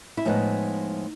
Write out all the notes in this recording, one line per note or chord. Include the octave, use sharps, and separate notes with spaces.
E4
A2 F3 G#3 B3 D#4